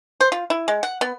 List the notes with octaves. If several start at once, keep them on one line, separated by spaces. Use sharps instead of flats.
C5
F4
E4
G#3
F#5
B3